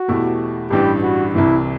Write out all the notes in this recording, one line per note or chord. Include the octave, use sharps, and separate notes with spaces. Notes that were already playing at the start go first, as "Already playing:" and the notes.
Already playing: F#4
E2 B2 A3 E4 G4
A1 G2 E3 G3 G4
F#4
C2 C3 E3 E4